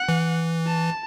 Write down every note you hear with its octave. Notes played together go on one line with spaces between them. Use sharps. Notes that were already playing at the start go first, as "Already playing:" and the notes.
Already playing: F#5
E3
A5